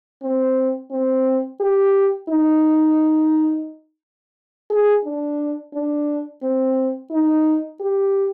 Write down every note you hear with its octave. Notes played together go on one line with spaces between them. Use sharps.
C4
C4
G4
D#4
G#4
D4
D4
C4
D#4
G4